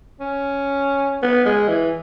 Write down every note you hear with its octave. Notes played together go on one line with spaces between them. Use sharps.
C#4
B3
G#3
E3